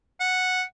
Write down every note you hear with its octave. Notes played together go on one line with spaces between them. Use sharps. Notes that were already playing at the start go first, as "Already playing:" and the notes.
F#5